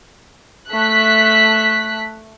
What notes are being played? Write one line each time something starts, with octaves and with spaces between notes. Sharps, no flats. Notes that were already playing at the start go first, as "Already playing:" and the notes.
A3 F#6 B6